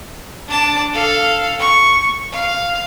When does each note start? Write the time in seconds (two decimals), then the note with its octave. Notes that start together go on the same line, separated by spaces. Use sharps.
0.48 D4 A5
0.93 A4 F5
1.59 C#6
2.32 F5